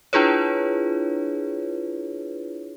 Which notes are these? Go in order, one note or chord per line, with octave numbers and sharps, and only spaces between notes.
D4 E4 F4 G#4 B4 C#5